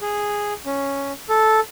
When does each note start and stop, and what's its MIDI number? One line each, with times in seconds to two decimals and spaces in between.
0.01 0.54 68
0.65 1.12 61
1.29 1.60 69